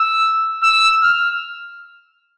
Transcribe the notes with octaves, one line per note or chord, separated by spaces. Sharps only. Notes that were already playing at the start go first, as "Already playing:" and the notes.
Already playing: E6
E6
F6